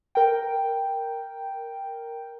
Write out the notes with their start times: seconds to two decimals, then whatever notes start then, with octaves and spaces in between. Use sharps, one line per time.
0.15 A#4 G5